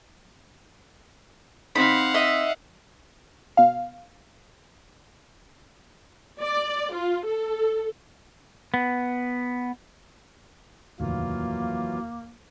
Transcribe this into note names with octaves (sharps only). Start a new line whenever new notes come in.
C4 D#4 F5 F#5 B5
D#5 E5
B2 F5
D5
F4
A4
B3
F1 D#2 A2 E3 F#3 A#3 F4